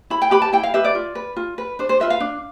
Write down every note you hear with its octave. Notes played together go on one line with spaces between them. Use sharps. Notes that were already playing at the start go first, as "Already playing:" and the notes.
E4 B5
G5
G4 B4 B5
A5
E4 G5
F5
G4 B4 E5
D5
F4
B4
F4
B4
D4 C5
C5
F4 B4 E5
F5
D4